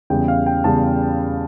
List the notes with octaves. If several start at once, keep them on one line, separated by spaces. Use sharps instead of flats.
E2 C#3 G3 G5
F5
G5
E2 C#3 G3 A5